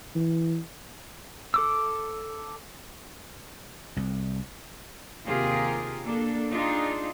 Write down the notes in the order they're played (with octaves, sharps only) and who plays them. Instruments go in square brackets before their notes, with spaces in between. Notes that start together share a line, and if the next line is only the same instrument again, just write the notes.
[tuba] E3
[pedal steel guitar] A4 D6 E6
[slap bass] C2
[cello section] D#2 C3 F4 G4 G#4 A#4
A#3 D4 A4
D4 D#4 F4 G#4